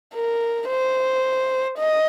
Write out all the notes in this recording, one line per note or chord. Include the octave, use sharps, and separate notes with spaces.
A#4
C5
D#5